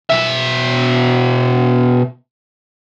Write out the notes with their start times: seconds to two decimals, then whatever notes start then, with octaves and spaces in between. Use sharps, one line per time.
0.10 B2 E5